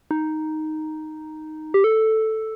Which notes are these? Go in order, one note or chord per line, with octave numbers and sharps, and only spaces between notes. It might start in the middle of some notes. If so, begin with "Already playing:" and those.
D#4
G4
A4